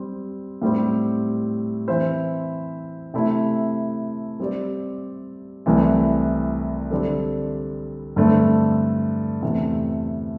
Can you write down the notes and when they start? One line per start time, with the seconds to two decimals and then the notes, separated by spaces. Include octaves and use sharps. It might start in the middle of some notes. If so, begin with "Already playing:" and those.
Already playing: G3 C4
0.62 A2 G3 C4 G4
1.88 E3 C4 E4 C5 E5
3.14 C3 A3 E4
4.40 G3 C4 G4 D5
5.66 C2 C3 E3 A3
6.91 D3 G3 C4 A4 D5
8.16 G2 D3 A3 C4
9.42 E2 C3 A3